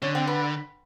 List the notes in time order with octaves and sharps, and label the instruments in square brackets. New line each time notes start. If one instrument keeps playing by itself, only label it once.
[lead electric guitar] D3 [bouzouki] C#4
[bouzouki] C4
B3